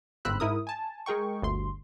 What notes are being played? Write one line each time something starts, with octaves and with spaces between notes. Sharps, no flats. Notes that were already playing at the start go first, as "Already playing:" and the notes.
G1 G#2 C4 B5 E6 F#6
G#2 E4 A#4 D#6
G#5 A5
G#3 G#4 A#4 G5 C#6
G1 D2 C6